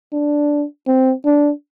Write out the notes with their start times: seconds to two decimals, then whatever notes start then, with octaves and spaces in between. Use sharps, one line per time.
0.12 D4
0.87 C4
1.25 D4